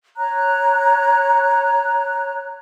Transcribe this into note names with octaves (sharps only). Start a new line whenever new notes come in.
C#5 A#5 F#6